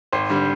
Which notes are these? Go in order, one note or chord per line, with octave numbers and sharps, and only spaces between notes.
G#1 C5
D3 G3